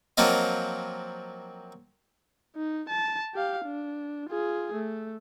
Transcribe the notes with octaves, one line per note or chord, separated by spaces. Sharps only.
F3 F#3 A#3 C4 F4 D#5
D#4
A5
G4 F5
D4
F4 G#4
A3